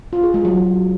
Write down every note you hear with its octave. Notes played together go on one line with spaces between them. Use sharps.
F4
G#4
G#3
F#3